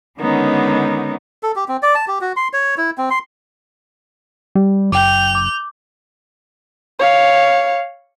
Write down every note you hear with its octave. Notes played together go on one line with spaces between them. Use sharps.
D3 D#3 G#3 B3 C#4 D#4
A4
G4
C4
D5
A5
G4
F#4
C6
C#5
E4
C4
C6
G3
F#1 G5 D6 G6 F7
D6
C#5 F5